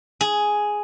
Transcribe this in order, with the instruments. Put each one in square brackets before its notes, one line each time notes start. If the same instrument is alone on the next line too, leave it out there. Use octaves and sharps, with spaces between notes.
[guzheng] G#4